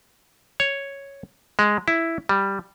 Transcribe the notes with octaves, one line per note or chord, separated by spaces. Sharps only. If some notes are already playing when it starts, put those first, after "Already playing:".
C#5
G#3
E4
G3